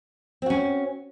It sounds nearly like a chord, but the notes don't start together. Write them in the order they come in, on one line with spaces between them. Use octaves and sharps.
C4 F#4 C#4